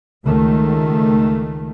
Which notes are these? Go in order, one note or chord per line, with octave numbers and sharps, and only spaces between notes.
C#2 D#3 A3